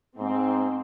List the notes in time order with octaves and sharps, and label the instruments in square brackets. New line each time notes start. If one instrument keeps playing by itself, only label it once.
[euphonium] G#2 [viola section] C4